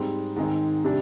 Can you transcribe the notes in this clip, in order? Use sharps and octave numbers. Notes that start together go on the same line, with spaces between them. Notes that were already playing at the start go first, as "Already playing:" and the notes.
Already playing: G#2 G3 C4
G#2 D#3 G#3 C4 D#4
C3 G3 D4